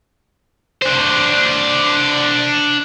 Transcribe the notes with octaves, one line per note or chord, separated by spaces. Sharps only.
D4 C5